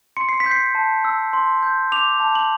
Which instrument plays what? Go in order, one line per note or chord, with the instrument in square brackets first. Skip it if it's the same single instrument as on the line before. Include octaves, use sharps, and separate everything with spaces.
[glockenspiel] C6 C#7
C7
B6
G6
C7
A5
E6
C6
G6
D6 F7
A5
F#7